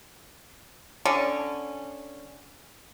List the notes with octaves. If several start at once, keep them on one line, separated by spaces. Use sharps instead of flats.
D3 C#4